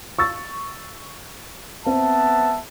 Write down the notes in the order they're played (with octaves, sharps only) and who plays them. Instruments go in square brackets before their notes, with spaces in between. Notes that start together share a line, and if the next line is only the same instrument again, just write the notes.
[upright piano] C#6 E6 A6
[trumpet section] B3 E5 A5 [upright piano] C4